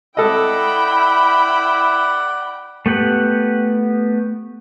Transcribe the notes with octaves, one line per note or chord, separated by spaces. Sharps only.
E4 A4 D5 D#5 F#5 G5 B5
A3 B3 G4 F#5